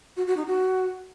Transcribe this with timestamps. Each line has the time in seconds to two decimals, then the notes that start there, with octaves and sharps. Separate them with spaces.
0.17 F#4
0.27 F#4
0.37 D#4
0.46 F#4